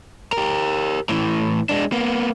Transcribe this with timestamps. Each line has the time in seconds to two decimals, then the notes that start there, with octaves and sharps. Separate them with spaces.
0.33 G4 A#4
1.09 A2 E3
1.69 G#3 D4
1.92 A#3 B3